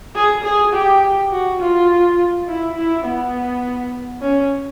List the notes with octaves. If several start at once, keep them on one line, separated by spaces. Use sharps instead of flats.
G#4
G#4
G4
F#4
F4
E4
E4
B3
C#4